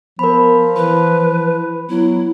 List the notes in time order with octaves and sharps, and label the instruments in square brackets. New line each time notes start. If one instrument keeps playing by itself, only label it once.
[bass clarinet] F3 [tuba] B3 [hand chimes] A#4 B5
[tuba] E3 [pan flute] B4 [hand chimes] B5
[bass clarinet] F#3 [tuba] B3 [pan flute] E4